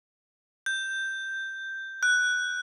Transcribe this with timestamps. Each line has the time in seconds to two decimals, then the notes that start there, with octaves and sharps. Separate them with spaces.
0.66 G6
2.03 F#6